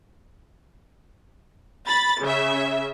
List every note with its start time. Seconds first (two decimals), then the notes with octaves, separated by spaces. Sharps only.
1.87 B5 A6
2.22 C#3 E5